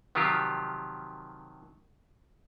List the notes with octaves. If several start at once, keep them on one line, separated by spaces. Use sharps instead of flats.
C3 D#3 F3 F#3 F4 G4